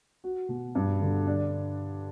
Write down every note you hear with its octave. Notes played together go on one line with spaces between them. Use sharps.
F#4
B2
G2
D3
D4